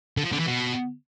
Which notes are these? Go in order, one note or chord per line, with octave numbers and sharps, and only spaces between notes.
D3
F3
D3
E3
B2